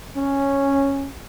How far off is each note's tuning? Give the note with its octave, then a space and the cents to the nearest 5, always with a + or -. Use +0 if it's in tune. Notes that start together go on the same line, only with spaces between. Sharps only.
C#4 -5